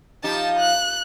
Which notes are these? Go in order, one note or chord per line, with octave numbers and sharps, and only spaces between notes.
F3 D#4 G4 A5
F#6